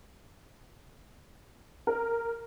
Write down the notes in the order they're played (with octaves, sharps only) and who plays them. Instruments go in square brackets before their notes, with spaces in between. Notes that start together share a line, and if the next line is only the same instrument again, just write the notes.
[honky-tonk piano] A#4